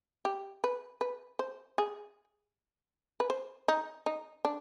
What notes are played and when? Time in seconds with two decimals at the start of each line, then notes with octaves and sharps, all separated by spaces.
0.25 G4
0.64 B4
1.01 B4
1.39 C5
1.78 G#4
3.20 B4
3.30 C5
3.68 D#4
4.06 D#4
4.45 D4